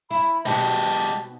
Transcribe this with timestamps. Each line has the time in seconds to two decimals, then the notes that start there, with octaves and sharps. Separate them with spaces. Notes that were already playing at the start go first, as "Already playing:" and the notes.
0.11 E4 B5
0.46 B2 G#3 C4 D#4 G4 A5